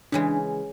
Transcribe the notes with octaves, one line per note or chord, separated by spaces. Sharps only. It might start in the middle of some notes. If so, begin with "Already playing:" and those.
C#3 E3 G#3 D4